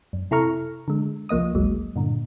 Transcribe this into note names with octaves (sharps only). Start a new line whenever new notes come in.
F#2
C3 E4 A4 A#5 C#6 F6
D3 G#3
C2 F3 A#3 D#5 D#6
G#1 D2 F#3 G#3
G2 A#2 D3